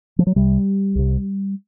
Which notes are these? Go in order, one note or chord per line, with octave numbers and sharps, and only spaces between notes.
F3
F#3
C2 C3 G3
C2 C3